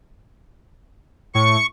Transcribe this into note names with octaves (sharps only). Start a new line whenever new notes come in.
A2 C#6